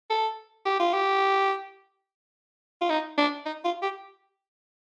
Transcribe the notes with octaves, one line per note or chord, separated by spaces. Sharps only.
A4
G4
F4
G4
F4
D#4
D4
D#4
F4
G4